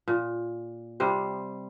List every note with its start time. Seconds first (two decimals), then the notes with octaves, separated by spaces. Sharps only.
0.08 A#2
1.00 C3 G3 C5